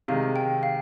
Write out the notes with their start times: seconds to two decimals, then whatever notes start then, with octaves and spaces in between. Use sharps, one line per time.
0.08 C3 D#3 G#3 F5
0.36 G5
0.63 F5